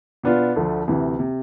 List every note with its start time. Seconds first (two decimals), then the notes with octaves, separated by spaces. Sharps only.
0.23 B2 B3 D4 F4
0.56 D2 D3 F3 A3
0.88 D2 C3 E3
1.19 C3